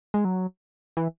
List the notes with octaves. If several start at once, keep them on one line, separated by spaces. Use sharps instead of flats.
G#3
F#3
E3